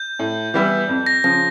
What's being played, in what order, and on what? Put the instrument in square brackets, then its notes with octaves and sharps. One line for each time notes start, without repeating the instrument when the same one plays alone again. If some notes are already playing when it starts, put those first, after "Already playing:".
Already playing: [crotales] G6
[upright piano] A2
E3 G3 B3 E4
F2
[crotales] A#6
[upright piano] C#3 F3 [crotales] A#6